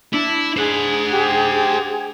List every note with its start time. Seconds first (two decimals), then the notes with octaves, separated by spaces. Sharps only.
0.13 D4 E4
0.57 G#4 C5 F#5
1.13 G4